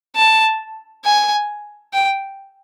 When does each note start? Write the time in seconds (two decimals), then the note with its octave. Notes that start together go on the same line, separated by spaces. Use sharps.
0.16 A5
1.04 G#5
1.93 G5